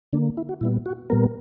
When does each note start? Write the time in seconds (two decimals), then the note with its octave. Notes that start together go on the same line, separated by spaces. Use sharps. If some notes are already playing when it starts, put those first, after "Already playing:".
0.13 D3 A#3 D4
0.37 E4
0.49 F#4
0.61 A#2 G3 B3 E4
0.86 F#4
1.10 A#2 G3 B3 A#4